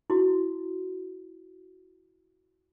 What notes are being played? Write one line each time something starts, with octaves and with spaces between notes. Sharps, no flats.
E4 F#4